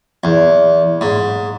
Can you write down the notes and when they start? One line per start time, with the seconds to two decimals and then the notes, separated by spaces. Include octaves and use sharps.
0.24 E2
1.01 G#2